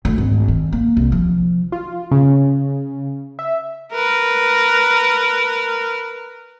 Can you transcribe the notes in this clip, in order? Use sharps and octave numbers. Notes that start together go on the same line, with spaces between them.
D2
G#1
D#3
A#3
C2
F3
F4
C#3
E5
A#4 B4